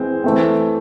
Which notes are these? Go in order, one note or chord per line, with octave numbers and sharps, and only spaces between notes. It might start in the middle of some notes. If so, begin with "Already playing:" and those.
Already playing: E3 G#3 C4
E3 A3 C4